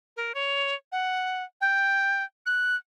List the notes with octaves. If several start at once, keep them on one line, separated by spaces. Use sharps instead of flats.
A#4
C#5
F#5
G5
F#6